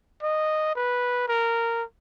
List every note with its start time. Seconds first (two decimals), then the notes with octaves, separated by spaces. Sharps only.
0.23 D#5
0.75 B4
1.28 A#4